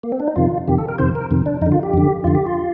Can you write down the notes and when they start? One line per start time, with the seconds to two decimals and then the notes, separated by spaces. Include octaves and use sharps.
0.03 A#3
0.12 C4
0.20 D4
0.27 D#4
0.36 F2 C3 D#3 F4
0.68 F2 C3 D#3 G4
0.78 A4
0.88 A#4
0.98 F2 C3 D#3 C5
1.15 A#4
1.31 F2 C3 D#3
1.46 D4
1.62 F2 D#4
1.66 D3
1.72 F4
1.83 G4
1.93 F2 D3
2.24 F2 D3 F4
2.35 G4
2.46 F4